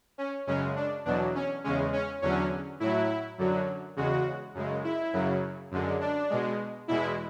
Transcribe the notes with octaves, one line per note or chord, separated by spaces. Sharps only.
C#4
F#2 C#3 G#3 C#4
D4
E2 B2 F#3 D4
C#4
E2 C#3 G#3 C#4
C#4
E2 D3 F#3 C#4
A2 F#3 E4
F#2 D3 F#3
E2 C#3 G#3 F#4
F#2 C#3 G#3
E4
F#2 C#3 F#3
F#2 D3 G#3
D4
B2 G#3
E2 B2 G#3 E4